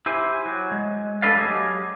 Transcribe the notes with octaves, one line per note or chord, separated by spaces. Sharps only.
E4 G4 C5 G#5
F#3
G#3
A3 D4 A4 B4 D5 F5
F#3 G4 G#4 D#5